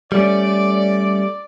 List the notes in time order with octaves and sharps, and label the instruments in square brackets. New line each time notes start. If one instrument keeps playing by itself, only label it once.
[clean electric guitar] G3 A3 C#4 [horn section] D5